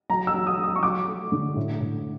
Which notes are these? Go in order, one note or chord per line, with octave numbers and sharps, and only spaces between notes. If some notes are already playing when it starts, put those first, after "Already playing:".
F#3 A#5
E6
F#3
D#6
F#3
D#6
C#6
F#3 D6
A3
D3
A2
A2